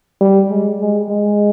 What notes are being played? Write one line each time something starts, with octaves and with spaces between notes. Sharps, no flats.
G3
G#3
G#3
G#3